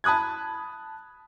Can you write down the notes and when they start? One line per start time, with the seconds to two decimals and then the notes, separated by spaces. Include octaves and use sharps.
0.04 A5 B5 D#6 F#6 G#6